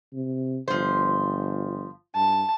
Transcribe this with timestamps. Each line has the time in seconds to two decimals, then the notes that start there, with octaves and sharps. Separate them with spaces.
0.13 C3
0.68 G1 F3 C5
2.16 G2 A5